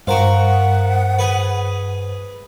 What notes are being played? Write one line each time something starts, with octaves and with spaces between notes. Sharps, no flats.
G2 F#4 A#4 C5 F5 F#5
G#4 B4